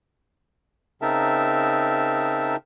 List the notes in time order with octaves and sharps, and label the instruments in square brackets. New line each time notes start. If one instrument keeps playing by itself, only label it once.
[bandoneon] C#3 C4 D#4 A#4 E5 A5